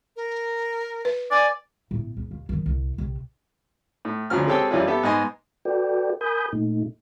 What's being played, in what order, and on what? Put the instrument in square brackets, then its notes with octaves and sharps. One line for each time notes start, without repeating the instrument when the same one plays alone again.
[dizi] A#4
[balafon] B4
[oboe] D5 [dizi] G#5
[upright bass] A2 B3
C#2
D#2
D#3 F#3
C2
B1 C3
[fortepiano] A2
D2 C#3 F3 F#3 F6
G#3 C4 G4 A4 C#5 G5
F#2 E3 G3 C#4 D4 F4
B3 G4 A4 E5
G#2 B3 D#5 G#5 C6
[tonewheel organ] F#4 A4 B4 D5 G5
A#4 G#5 B5 D#6 G6
A#2 A3 D#4